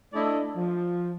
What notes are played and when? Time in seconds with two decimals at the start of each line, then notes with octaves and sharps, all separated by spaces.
0.13 A3 D4 E4 D5 D#5
0.56 F3